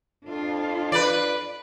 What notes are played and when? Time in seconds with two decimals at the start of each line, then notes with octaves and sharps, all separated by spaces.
0.25 F2 D4 F4
0.92 B4 D5